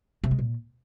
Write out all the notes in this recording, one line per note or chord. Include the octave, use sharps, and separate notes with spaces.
C3
G#3
A#2